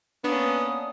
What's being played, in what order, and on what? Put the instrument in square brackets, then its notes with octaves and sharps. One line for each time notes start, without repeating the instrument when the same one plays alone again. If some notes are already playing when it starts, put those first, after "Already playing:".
[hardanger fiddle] A#3 C#4 [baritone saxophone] B3 [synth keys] D4 [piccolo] D#6